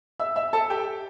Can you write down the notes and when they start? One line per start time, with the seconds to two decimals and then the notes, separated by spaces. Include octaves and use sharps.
0.20 E5 E6
0.36 E5 E6
0.53 A4 A5
0.70 G4 G5